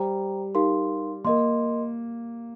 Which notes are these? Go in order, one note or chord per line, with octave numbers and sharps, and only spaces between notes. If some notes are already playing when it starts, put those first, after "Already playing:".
Already playing: G3 C5 G5 A#5
D#4 G4 A#4 F5 C6
A#3 A#4 D#5 C6